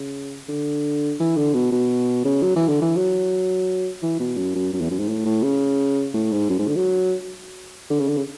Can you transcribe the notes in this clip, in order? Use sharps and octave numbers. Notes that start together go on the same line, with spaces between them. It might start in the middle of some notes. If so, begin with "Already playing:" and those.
Already playing: C#3
D3
E3
D3
B2
B2
C#3
F#3
E3
D3
E3
F#3
E3
B2
F#2
F#2
F#2
E2
F#2
G#2
A2
A2
C#3
A2
G#2
F#2
G#2
D3
F#3
D3
C#3
D3
C#3